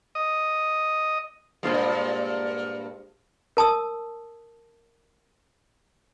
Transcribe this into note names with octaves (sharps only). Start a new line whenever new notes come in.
D#5
G2 A#2 G#3 F4 C5
A#4 A5 D#6 E6